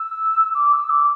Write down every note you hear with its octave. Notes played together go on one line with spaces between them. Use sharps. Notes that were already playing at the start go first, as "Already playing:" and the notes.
Already playing: E6
D6
E6
D6